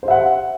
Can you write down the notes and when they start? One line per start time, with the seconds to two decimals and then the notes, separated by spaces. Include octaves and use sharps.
0.03 C5
0.05 G4
0.08 E5
0.10 F#5